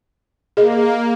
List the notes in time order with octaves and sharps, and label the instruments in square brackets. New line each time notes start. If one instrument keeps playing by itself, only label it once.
[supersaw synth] A#3 [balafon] G#4 D#5